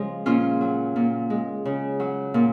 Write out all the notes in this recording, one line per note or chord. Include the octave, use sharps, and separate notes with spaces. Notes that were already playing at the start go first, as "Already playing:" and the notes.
Already playing: C#3 F3 G#3
A#2 C#4 F4
F#3
A#2
G#3
C#3
F#3
A#2